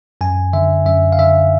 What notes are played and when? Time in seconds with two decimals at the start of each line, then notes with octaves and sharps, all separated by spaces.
0.21 F#2 G#5
0.53 D3 E5
0.86 F#2 E5
1.12 F5
1.18 D3 E5